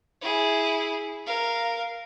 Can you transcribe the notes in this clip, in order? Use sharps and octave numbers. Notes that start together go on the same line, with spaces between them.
E4 G#4
A#4 F5